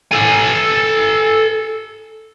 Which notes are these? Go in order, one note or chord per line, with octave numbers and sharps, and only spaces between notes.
A4 G#5